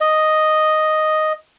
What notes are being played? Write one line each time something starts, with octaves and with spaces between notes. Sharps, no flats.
D#5